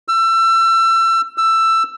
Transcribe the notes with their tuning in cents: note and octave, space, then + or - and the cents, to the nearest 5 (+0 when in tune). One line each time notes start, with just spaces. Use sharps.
E6 +30
E6 +15